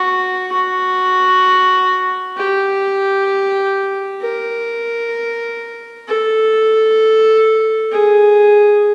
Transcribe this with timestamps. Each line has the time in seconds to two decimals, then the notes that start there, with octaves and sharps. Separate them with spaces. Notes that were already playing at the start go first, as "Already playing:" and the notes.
Already playing: F#4
0.52 F#4
2.37 G4
4.22 A#4
6.07 A4
7.92 G#4